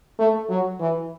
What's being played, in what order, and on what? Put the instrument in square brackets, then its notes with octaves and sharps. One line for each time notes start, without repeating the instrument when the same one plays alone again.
[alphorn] A3
F#3
E3